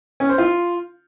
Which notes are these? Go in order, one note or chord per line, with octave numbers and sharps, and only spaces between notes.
C#4
C5
F4